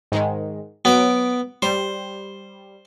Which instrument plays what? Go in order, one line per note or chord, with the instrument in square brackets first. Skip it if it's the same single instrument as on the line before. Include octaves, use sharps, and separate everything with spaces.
[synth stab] G#2 D#3 G#3
[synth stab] F#3 D7 [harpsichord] B3
[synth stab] G3 [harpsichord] C5